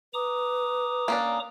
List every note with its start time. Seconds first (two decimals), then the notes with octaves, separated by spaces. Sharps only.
0.14 B4 A#5 D6 D#6
1.08 A#3 C#4 D4